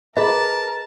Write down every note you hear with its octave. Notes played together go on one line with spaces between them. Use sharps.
G#4 A#4 B4 D#5 A5